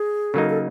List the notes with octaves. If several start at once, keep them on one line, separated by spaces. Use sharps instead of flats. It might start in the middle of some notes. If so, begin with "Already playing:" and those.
Already playing: G#4
C#3 F#3 A#3 D#4 A4
A4